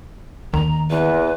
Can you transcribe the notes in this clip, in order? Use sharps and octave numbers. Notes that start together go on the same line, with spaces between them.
D#2 D#3 A#5
E2 B4